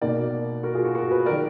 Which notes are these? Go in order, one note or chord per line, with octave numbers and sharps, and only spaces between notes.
B2 A#3 D#4 A#4 D5
F#4 A#4
F4 G#4
F#4
F#4 A#4
G#4 B4
D#3 F#3 A#4 D5